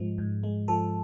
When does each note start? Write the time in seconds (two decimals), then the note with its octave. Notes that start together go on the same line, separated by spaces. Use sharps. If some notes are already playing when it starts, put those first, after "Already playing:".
Already playing: G#2 F3 G#3
0.18 G#2
0.43 G#3
0.68 F3 A4